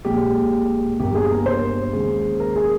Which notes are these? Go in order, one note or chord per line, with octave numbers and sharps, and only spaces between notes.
A#1 A#2 G#3 G4
G1 G2 G3 A#3 G4
G#4
A#4
C5
D#2 C#3 G#3
A#4
G#4